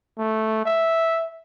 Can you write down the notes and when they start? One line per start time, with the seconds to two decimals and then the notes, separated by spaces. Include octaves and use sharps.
0.18 A3
0.66 E5